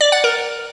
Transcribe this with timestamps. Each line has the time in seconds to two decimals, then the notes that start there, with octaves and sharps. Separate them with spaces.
0.01 D5
0.12 F#5
0.24 A#4